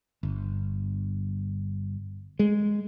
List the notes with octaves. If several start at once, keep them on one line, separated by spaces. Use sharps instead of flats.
G1
G#3